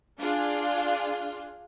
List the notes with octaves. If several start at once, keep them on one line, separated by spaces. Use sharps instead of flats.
D4 F4 G#4